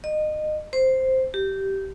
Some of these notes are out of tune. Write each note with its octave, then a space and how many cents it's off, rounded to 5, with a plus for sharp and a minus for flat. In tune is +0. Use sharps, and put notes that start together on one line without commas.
D#5 -25
C5 +0
G4 -15